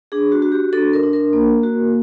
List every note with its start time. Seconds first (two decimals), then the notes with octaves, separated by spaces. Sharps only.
0.12 D4 G#4
0.32 F#4
0.42 F#4
0.52 G4
0.73 D4 A4
0.93 A#4
1.03 D4
1.13 A#4
1.33 A#3
1.63 F#4